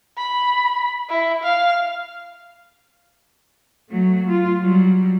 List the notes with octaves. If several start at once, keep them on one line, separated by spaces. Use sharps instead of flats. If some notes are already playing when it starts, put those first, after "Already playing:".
B5
E4
F5
F#3 A3
F4
F#3 G3